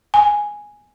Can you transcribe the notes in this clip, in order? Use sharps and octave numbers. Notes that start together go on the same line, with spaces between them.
G#5